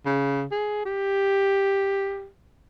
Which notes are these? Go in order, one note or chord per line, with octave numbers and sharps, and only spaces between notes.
C#3
G#4
G4